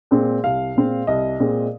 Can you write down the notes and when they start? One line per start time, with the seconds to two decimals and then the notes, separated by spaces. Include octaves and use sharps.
0.11 A#2 G#3 C4
0.44 C2 F5
0.76 A#2 G#3 C4
1.07 C2 D#5
1.40 A#2 G#3 C4